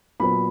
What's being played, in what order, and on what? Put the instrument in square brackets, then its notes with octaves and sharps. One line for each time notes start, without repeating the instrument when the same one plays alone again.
[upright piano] A#2 F#3 B3 B5